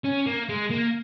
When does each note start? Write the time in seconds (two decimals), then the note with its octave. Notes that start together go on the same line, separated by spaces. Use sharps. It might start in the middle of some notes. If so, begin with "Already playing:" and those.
0.05 C#4
0.27 A#3
0.49 G#3
0.70 A#3